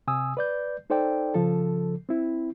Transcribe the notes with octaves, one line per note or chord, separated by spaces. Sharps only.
C3 G#5 D#6 E6
B4 D5 G6
D#4 A4 C5 D5 G5
C#3 F3 A4
C4 E4